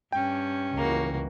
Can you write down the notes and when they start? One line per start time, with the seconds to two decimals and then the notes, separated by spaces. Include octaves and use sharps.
0.12 G2 C#4 G5
0.77 C#2 E3 A#3 F#4